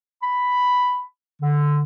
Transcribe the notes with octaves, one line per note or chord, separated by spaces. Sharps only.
B5
D3